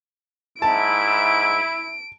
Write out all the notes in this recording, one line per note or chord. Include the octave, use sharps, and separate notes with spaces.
G#2 E4 A5 D7